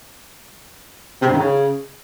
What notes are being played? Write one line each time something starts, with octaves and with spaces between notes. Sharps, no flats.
C3
G2
D#3
C#3